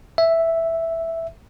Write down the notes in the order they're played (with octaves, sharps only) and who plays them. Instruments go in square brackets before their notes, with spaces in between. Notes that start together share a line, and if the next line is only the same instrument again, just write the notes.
[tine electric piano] E5